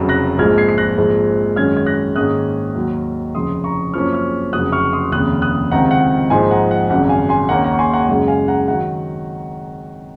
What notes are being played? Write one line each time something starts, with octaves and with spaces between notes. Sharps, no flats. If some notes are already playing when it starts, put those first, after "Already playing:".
Already playing: F1 F2 C#3 F#3
F#6 A#6
A#1 G#2 F3 G#3 F6 G#6
G#6 C7
C7
F#6 A#6
A#1 G#2 F3 G#3
F#2 D#3 G#3 C#4 F6 G#6
G#6
F#6 A#6
G#2 D#3 A#3 C#4 D#6 F#6
D#2 D#3 F#3
F1 F2 C#3 C6 D#6
A#5 C#6
F#2 F3 A#3 C#4 C#6 F6
C#6 F6
F1 F2 C#3 F#3 D#6 F#6
C#6 F6
C6 D#6
F1 D#2 C#3 D#6 F#6
D#6 F#6
C#2 C3 D#3 F#5 A#5
F#5
A#1 G#2 F3 C4 D#4 G#5 C6
F#5 A#5
F#5
G#1 F#2 C#3 G#3 F#5
F5 G#5
G#5 C6
D#2 D#3 A#3 C#4 F#5 A#5
F#5 A#5
C#6
G#5 C6
F#5 A#5
F#2 C#3 G#3 F#5
F5 G#5
F#5 A#5
D#3 F#3 F#5 A#5